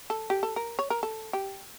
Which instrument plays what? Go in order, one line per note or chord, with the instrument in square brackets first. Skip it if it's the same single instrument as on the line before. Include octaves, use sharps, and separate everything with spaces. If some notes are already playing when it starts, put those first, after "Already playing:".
[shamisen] A4
G4
A4
A#4
C#5
A#4
A4
G4